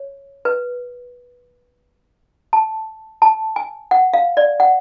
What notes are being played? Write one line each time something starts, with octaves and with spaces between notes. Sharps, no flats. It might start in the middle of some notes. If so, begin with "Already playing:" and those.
Already playing: C#5
B4
A5
A5
G#5
F#5
F5
D5
F#5